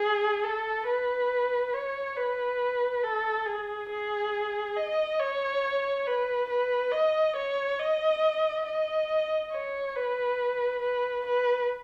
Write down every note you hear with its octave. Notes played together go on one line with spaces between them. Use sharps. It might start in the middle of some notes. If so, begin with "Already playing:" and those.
Already playing: G#4
A4
B4
C#5
B4
A4
G#4
G#4
D#5
C#5
B4
B4
D#5
C#5
D#5
D#5
C#5
B4
B4
B4